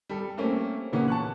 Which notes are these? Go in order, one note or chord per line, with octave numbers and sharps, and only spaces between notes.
G3 A4
A3 A#3 C4 C#4
A#2 C#3 E3 A#3 B3 C#4
A5 C#6 F#6